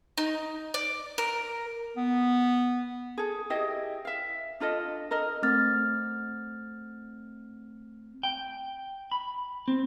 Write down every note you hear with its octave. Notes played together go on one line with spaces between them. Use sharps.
D#4
D5
A#4
B3
G#4 A4
E4 G4 G#4 D#5
E5 F5
D4 F4 A4 D#5
A4 A#4 D#5
A3 C4 F6 A6
G5
B5
C4